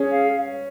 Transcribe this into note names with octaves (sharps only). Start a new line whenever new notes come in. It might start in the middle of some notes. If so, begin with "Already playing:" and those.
Already playing: C#4 G#4
F5